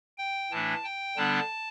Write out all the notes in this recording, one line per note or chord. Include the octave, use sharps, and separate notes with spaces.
G5
A2 E3 A3 D4 A5
G5
D3 G3 B3 D4 A5